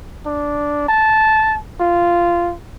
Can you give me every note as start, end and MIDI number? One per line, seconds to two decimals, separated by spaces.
0.26 0.83 62
0.89 1.57 81
1.80 2.54 65